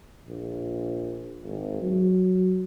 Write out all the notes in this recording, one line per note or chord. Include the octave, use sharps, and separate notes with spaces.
A#1
G#1
F#3